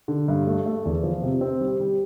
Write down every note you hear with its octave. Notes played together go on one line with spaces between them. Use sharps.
D3
G2
A3
A3
E2
F3
C3
C4
G3
G3